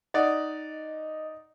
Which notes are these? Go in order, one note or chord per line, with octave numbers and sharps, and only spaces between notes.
D#4 D5 D#5 F#5